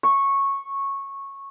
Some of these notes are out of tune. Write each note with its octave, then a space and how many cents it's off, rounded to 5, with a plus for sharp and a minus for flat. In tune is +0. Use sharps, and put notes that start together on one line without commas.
C#6 -10